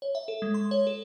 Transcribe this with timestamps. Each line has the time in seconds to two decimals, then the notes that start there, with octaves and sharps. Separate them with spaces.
0.02 C#5
0.15 E5
0.28 A4
0.42 G#3
0.54 C6
0.71 C#5
0.87 A4